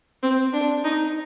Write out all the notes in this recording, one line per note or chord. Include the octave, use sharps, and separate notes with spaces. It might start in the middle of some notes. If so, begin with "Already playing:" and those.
C4
D4
D#4